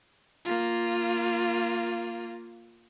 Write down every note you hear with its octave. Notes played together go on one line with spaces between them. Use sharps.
A#3 F4